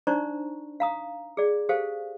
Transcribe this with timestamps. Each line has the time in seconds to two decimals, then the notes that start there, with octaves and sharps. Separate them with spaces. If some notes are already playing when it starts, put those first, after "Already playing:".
0.07 D4 D#4 C5 D5 A#5 C#6
0.80 F5 A#5 D#6
1.37 G#4 D5
1.69 G4 A4 C5 F5